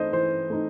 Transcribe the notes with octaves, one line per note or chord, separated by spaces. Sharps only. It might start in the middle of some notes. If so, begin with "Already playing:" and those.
Already playing: E3 A3 D#4 C5 D#5
E3 C5
A3 D#4